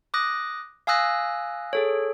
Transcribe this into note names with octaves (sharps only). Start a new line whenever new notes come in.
D6 D#6 F#6 A#6
F5 G#5 D#6 E6 F#6 A#6
G#4 A4 C#5